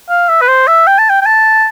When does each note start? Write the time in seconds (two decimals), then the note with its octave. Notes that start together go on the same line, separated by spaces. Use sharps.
0.09 F5
0.29 E5
0.41 B4
0.48 C5
0.67 E5
0.87 G5
0.99 A5
1.10 G5
1.22 G5
1.26 A5